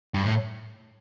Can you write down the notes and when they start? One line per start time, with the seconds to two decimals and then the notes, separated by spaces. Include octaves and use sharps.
0.14 G2
0.24 A2